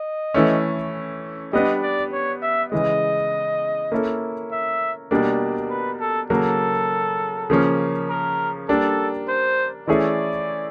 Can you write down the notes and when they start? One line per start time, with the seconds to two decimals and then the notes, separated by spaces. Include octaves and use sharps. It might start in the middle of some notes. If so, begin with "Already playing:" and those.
Already playing: D#5
0.34 E3 A3 C#4
1.53 G3 B3 D4 D#5
1.83 D5
2.12 C#5
2.42 E5
2.72 C#3 E3 G#3 D#5
3.92 A#3 C#4 E4 A4
4.52 E5
5.11 B2 G3 A#3 D4
5.70 B4
6.00 A4
6.30 C#3 F#3 A#3 A4
7.50 C#3 F3 A#3 C#4
8.09 A#4
8.69 G3 A#3 D4 A4
9.28 C5
9.87 E3 A3 C#4 E4 G#4 D5